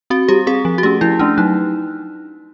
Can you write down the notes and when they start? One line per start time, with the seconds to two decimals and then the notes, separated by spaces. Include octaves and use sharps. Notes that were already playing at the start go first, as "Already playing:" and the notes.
0.10 C4 F#4
0.28 G3 G4
0.47 C4 G#4
0.65 F3
0.78 F#4
0.83 A3 C#4 G4
1.01 F3 E4
1.19 A3 C#4 D4
1.38 F#3 D#4